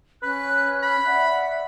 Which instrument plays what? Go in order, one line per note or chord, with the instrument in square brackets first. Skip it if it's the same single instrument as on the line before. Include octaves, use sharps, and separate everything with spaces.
[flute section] C#4 F#6 [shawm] B4
[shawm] B5
[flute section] D5 E5 F#5